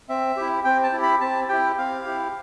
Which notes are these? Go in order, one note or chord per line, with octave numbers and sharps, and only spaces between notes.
C4 E5
E4 G4
C4 G5
A5
E4 G4
B5
C4 A5
E4 G4 G5
C4 F5
E4 G4